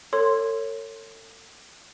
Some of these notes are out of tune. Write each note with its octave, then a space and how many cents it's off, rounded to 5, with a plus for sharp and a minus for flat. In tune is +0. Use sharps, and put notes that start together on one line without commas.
A4 +40 C#5 -5 C6 +0